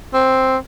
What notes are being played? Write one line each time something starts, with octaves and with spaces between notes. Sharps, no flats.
C4